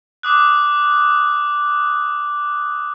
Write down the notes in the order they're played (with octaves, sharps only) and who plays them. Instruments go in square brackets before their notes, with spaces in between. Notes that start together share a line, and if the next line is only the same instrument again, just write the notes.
[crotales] D6 D#6 F#6